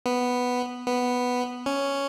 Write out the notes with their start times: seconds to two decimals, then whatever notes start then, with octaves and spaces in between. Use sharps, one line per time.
0.06 B3
0.86 B3
1.66 C#4